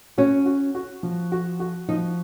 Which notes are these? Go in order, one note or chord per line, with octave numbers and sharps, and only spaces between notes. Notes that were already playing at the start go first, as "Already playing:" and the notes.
C#4 F#4
F#4
F#4
F3
F#4
F#4
F3 D#4